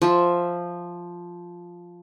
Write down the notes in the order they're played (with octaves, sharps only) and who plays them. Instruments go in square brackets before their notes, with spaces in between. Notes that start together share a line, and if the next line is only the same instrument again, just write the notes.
[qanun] F3 E5